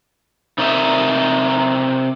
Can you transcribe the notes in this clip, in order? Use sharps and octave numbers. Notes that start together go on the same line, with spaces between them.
C3 D#4 A#4 D#5 E5